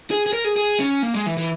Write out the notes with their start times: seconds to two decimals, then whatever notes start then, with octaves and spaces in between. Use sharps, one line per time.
0.11 G#4
0.26 G#4
0.33 A#4
0.45 G#4
0.56 G#4
0.80 C#4
1.03 A#3
1.14 G#3
1.26 E3
1.37 E3